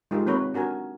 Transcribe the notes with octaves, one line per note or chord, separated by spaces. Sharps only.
G#3 D#4 F4 G4 A#4
A#3 C4 B4 C#5 A#5
D4 F#4 A#4 G#5